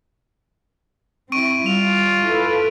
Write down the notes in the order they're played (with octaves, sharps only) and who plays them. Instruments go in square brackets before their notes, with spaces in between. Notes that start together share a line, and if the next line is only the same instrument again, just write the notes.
[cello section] C4 E4 [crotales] C#6 D7 D#7
[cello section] G3 [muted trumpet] F4 [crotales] F7
[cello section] E4 A4 B4